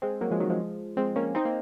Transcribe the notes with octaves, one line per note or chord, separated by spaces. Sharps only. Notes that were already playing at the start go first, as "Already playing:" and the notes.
G#3 C4
F#3 A#3
F3 G#3
D#3 F#3
F3 G#3
G#3 C4
A#3 C#4
C4 D#4
A#3